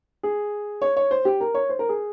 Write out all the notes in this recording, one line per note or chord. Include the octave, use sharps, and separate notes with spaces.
G#4
C#5
C#5
C5
G4
A#4
C#5
C5
A#4
G#4